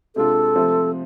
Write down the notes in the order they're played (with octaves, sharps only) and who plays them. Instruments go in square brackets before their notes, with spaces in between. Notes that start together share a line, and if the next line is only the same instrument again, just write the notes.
[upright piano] C3 G#3 D4 F4 [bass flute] A4
[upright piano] C3 F3 A3 C4